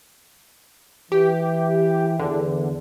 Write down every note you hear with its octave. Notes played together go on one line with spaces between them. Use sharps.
E3 G4
E2 D3